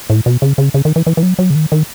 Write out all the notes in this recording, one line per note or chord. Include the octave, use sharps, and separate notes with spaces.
A2
B2
C#3
C#3
C#3
D#3
E3
E3
E3
F#3
F#3
C#3
D#3
D#3